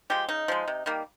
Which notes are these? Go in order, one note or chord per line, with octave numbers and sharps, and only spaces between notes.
F3 G#3 G4
C#3 D#4
F3 G#3
C3
D#3 G3 A#3